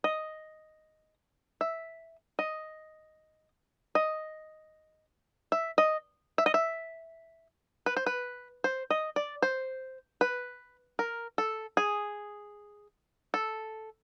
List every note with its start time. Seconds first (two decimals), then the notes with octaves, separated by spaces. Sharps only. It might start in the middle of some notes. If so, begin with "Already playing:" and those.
0.04 D#5
1.61 E5
2.39 D#5
3.95 D#5
5.52 E5
5.78 D#5
6.38 E5
6.46 D#5
6.54 E5
7.86 B4
7.96 C5
8.06 B4
8.64 C5
8.90 D#5
9.16 D5
9.42 C5
10.21 B4
10.99 A#4
11.38 A4
11.77 G#4
13.34 A4